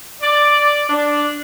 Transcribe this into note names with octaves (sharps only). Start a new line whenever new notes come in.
D5
D4